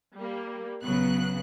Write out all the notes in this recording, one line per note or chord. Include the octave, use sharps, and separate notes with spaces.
G3 A#3
A#1 C#3 F#3 B3 F#6